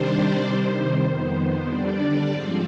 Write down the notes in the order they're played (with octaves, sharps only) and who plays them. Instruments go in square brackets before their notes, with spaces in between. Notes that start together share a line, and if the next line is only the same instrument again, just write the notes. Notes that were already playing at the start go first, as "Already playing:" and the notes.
Already playing: [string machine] C3 D#3 G3 D4 C5
D5
C3 D#3 G3 C5
F2 D#3 B3 C5
D3 G3 D4 D5
G#2 F3 C4